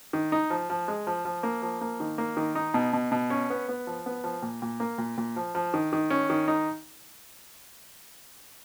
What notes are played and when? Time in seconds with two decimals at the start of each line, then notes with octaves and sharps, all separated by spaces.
0.13 D#3
0.32 D#4
0.50 F3
0.70 F3
0.88 G#3
1.07 F3
1.25 F3
1.43 A#3
1.62 F3
1.81 A#3
2.00 D#3
2.18 A#3
2.37 D#3
2.55 D#4
2.74 B2
2.93 B2
3.12 B2
3.30 C#4
3.50 B3
3.69 B3
3.87 F3
4.06 B3
4.24 F3
4.42 A#2
4.62 A#2
4.80 A#3
4.98 A#2
5.18 A#2
5.36 F3
5.55 F3
5.74 D#3
5.93 D#3
6.10 C#4
6.30 D#3
6.48 D#4